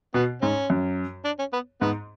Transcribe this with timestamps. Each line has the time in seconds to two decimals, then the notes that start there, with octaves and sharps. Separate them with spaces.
0.14 B2 B3
0.42 G#2 C#4
0.70 F#2
1.25 D4
1.39 C#4
1.53 B3
1.81 G#2 B3